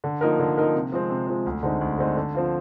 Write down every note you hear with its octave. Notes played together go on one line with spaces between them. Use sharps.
D3
F3 A#3 D#4 A#4
D3
F3 A#3 D#4 A#4
C3
F3 G#3 C4
C3
F3 G#3 C4
D2
D3 G#3 C4 D#4
D2
D3 G#3 C4 D#4
D3
F3 C4 F4